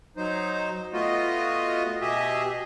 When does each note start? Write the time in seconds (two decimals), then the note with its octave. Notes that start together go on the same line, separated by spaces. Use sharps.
0.17 F#3 D#4 C5
0.93 A3 B3 F4 F#4 D#5
2.01 B2 G4 G#4 D#5 E5